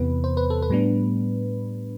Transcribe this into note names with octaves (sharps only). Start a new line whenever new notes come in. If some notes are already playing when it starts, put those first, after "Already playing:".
Already playing: E2 C3 E3 B3 B4
C5
B4
A4
B4
A2 G3 B3 D4